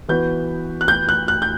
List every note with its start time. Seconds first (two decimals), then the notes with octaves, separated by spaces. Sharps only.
0.09 E3 B3 F#4 B4 G6
0.81 F#6
0.88 G6
1.09 F#6
1.28 F#6
1.42 G6